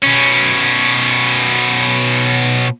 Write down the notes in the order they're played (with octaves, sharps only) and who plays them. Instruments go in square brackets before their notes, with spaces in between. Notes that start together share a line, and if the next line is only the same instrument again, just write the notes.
[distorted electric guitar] B2 C#4